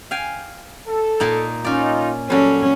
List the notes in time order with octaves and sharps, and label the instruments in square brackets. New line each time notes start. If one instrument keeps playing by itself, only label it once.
[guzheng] F5 G5 G#5
[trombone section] A4
[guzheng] A#2 A#3 D#4
[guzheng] C#4 D5 [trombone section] D#4 F4
[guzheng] F#3 G3 [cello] C#4 [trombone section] A4